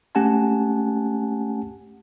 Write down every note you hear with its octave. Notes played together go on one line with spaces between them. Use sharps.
A3 C#4 G4 F#5 G#5 A5